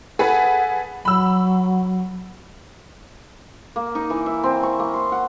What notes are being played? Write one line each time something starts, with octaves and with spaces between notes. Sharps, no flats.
G#4 A4 B4 F#5
F#3 B5 E6
A#3
D#4
E3
E5
C4
C#6
A#3
C6
F#5